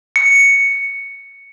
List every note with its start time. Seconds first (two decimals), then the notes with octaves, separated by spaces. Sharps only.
0.16 C#7